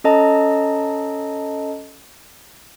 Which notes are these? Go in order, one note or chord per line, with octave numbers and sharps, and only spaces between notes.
C#4 A4 D#5 A5 A#5